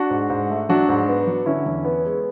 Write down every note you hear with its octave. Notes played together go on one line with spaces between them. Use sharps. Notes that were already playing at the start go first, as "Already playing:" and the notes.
Already playing: D4 F#4
G#2
G#2
A3
F#3 D4 F#4
G#2
B3
F#3
D3 C#4 E4
E2
B3
G#3